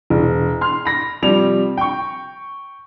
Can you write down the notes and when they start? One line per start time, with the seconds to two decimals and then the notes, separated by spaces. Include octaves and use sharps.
0.10 E1
0.61 C6 F6
0.85 B5 A#6
1.23 C3 F3 G3 F7
1.77 G5 C#6